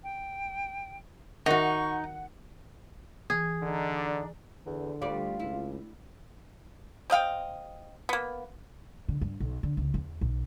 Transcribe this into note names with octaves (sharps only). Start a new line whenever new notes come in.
G5
D#3 D#4 F#4 F#5 C#6
E3 G#4
D3 D4 D#4 D5
E2 D3
D2 G3 F4 D5
C#2 E4
C4 D#5 F5 G5
A#3 B3
D3
G2
B1
D3
C#2
E2
B1